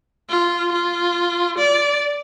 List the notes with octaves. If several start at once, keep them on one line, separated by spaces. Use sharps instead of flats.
F4
F4
D5